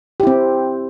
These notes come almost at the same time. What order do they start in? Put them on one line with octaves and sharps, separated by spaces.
G4 E4 C4